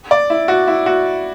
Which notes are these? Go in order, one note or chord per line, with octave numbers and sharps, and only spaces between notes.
D5
E4
F#4
E4
F#4